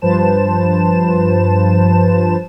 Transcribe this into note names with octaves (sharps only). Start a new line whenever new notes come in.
G2 F3 B4 C5 A5 E7